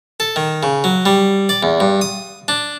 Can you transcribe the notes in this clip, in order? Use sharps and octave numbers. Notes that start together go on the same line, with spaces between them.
A4
D#3
C#3
F#3
G3
D5
E2
G2
D#6
D4